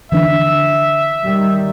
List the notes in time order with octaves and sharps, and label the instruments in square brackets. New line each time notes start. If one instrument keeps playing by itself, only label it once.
[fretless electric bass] D3 E3 D4 [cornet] E5
[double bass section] D#3 G3